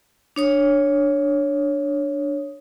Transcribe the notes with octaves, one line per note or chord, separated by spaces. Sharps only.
D4 C#5 D#6